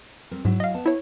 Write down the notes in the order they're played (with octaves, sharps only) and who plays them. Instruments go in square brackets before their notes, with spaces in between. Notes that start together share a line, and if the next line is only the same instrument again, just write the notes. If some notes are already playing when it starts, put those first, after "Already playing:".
[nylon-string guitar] G3 C4 A#4
[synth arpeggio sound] G#2 [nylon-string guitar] F#3 E4
[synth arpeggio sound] D#5 F5
[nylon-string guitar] B3 A5
[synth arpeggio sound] E4 C#5